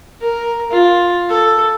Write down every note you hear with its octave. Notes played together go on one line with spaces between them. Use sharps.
A#4
F4
A4